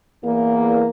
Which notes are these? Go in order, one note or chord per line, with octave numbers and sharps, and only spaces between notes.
E2 A#3